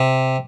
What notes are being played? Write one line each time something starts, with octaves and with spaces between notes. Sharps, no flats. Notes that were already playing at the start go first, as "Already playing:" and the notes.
Already playing: C3